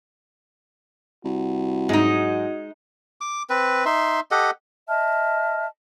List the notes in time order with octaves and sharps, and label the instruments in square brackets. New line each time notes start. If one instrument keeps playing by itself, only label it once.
[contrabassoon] C2 [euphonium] F#4
[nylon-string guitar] G#2 F#3 [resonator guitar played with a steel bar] G#3 D#4
[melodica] D6
C4 B4
D#4 E5 C6
G4 A4 D#5 F#5
[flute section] D#5 E5 A5 F6